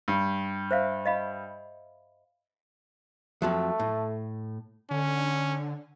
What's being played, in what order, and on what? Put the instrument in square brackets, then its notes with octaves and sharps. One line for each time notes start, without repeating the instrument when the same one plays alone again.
[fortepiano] G2
[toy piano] C5 E5 F5
D#5 F5 B5
[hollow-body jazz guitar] F2 F3 F#3 [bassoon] A3
[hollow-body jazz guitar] A2
[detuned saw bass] D3 [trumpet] C#4